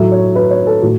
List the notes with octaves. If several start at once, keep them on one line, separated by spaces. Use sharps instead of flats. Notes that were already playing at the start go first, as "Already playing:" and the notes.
Already playing: A2 F#3 A3 E5
C#5
B4
C#5
A4
A2 F#4